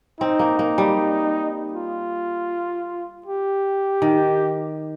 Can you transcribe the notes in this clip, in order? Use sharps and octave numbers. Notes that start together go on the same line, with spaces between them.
C4 D#4
A#3
A#3
G3
F4
G4
D#3